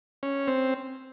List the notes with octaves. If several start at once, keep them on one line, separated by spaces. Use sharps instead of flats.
C#4
C4